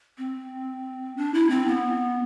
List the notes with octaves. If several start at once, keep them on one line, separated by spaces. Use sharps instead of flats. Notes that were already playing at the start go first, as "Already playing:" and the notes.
C4
D4
E4
C4
B3